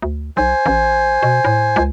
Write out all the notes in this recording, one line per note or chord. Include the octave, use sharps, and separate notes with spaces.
D2
B1 C5 G#5
A1
B2
A2
C#2